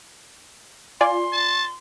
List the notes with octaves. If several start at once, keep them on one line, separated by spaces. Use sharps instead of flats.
F4 D5 G#5 C6
A5